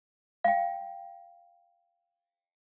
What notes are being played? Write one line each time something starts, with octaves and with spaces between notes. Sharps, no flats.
F5 G5